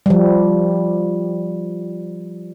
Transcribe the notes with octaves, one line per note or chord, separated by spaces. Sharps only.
F3 G3